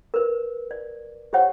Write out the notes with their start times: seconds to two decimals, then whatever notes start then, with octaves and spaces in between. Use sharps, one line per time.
0.14 A#4 B4
0.71 D5
1.33 G4 C5 C#5 F#5